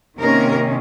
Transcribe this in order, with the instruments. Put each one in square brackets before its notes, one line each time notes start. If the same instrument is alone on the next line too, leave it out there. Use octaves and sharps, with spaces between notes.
[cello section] C3 D#3 A#3 C#4 A#4